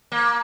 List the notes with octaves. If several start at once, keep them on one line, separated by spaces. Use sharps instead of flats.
A#3